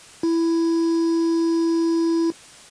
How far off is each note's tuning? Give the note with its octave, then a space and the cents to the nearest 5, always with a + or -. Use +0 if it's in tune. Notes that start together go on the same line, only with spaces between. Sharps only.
E4 +10